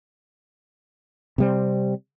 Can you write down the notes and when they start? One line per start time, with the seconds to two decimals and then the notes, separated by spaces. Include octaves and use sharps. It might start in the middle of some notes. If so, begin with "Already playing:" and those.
1.38 C3 G3 C4